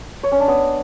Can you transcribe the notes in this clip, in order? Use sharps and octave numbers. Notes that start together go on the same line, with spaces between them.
C#5
C#4
D4
B3